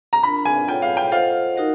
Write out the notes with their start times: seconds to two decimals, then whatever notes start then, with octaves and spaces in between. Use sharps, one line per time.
0.13 A#5
0.23 D4 F4 A#4 B5
0.45 G#5
0.68 F4 A4 C#5 F#5 G5
0.82 F5
0.97 G5
1.12 F4 A4 C5 D#5 F5 F#5
1.56 D#4 F#4 A#4 D#5 F#5